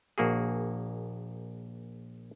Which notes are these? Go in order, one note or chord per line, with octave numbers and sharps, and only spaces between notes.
A#1 A#3 F#4 G#4